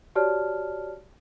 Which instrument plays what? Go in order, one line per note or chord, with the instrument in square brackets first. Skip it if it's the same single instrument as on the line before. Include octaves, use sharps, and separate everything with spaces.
[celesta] F#4 G4 C#5 D5 A5 F6